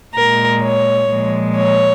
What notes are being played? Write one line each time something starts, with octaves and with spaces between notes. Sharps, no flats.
A#2 G#3 A#4
C#5
A#2 F3 G#3
C#5